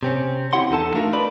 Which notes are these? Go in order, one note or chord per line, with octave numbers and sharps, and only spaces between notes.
C3 C4 C#4
C4 E4 G4 F#5 C6
E2 D#4 A4 A5
A3 D4 F4 F#4 A#4
D4 D#4 B4 D5 B5